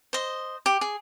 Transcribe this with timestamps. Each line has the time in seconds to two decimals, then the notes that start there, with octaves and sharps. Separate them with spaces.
0.13 C5 D#5
0.66 G4
0.81 G#4